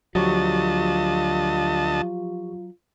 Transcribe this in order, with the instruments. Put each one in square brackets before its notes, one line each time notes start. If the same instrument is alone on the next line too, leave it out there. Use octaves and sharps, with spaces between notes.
[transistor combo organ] D2 D#5 A5 [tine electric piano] F3 G4 C#6 [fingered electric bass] F#3 [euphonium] F4